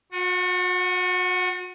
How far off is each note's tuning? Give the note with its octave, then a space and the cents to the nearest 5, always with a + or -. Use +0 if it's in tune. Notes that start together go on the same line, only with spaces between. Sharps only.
F#4 -40 F#5 +0